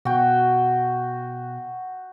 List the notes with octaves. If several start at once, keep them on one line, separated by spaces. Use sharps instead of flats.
B2 F#4 G5